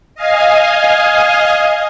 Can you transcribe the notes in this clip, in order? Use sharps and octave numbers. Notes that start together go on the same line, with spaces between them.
D#5 F5 G#5